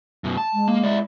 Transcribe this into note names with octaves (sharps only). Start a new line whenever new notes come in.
F#2 B2
A5
G#3
A#3
E4 D5